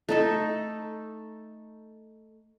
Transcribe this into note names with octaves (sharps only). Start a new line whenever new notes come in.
A3 D#4 A4